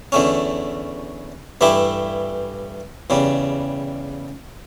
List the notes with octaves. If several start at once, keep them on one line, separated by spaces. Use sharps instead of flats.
E2 D3 A3 C#4
G2 E3 A3 E4 G4
E2 C#3 G3